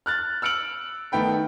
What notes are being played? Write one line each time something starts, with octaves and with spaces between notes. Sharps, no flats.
F6 F#6 A6
E6 F6 C#7 D7 F#7
D#3 A3 B3 G5 B5